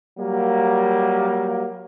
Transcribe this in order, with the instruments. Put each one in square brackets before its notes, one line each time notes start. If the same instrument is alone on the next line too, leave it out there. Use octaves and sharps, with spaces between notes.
[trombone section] F#3 G3 A#3